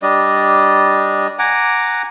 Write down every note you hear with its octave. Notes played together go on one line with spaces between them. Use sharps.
G3 D4 D#5
F#5 G#5 A#5 D6